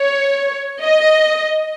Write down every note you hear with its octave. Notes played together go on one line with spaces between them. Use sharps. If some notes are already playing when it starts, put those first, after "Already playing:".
Already playing: C#5
D#5